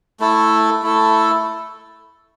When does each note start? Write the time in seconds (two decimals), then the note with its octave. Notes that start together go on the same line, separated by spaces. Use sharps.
0.20 A3 E4 A4
0.82 A3 E4 A4